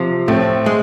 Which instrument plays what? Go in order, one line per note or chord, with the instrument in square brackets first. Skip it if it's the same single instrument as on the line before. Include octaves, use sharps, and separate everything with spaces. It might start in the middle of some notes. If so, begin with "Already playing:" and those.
Already playing: [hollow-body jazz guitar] C3 F3
[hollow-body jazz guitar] A2 [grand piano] A3 C4
[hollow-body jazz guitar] G#3